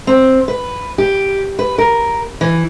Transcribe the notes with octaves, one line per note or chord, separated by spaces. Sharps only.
C4
B4
G4
B4
A#4
E3